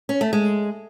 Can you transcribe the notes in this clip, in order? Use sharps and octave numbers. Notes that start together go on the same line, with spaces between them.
C#4
A3
G#3